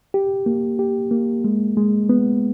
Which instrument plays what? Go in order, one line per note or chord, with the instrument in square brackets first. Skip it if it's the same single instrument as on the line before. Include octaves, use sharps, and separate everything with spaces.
[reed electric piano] G4
A#3
G4
A#3
G#3
G#3
B3